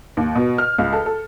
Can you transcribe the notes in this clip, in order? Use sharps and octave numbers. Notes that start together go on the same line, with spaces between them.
D#2
B2
F6
C#2
A4
A4